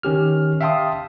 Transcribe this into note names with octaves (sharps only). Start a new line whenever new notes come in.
D#3 C#4 G4 F6
E5 F5 G5 A5 C6 D#6